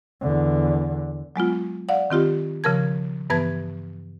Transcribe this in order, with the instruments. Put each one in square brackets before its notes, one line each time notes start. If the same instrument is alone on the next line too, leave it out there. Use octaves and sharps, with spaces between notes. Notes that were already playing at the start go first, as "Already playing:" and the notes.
[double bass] E2 D3
[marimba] F#3 G#3 B3 F4
D5 F5 F#5
D#3 C4 F4 G4
C#3 F3 A#4 A5 G#6
G2 E3 B3 B4 A5 G#6